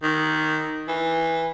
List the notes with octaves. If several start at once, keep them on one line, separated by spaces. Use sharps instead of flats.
D#3
E3